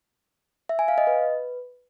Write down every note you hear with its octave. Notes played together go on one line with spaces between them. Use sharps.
E5
G#5
F5
D#5
B4